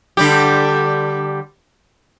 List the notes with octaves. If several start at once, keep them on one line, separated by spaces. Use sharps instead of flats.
D3 G3 G4